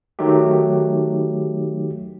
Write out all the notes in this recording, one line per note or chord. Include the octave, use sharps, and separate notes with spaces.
D#3 F#3 A3 D#4 G4